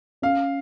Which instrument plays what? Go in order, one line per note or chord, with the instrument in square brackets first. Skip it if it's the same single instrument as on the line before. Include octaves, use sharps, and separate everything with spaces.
[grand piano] C#4 [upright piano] F5